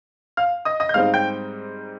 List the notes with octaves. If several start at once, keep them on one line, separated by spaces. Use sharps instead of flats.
F5 F6
D#5 D#6
D#5 D#6
G6
G#2 G3 C4 D#4 F5 F6
G5 G6